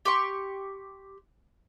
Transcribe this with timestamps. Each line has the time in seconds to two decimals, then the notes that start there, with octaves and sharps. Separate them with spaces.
0.05 G4 C6 C#6